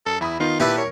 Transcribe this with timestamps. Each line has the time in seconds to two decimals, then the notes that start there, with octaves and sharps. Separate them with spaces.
0.06 F#2 A4
0.21 E2 E4 B5 D#6
0.40 D#3 B3 D#4 F4
0.60 A#2 D4 E4 G4 B4
0.78 A#4 C#5